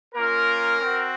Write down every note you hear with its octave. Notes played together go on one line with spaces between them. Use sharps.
A#3 C#4 F4 A#4
C4 F#4